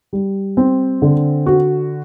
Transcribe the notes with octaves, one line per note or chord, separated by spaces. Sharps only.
G3
C4
D3
F#4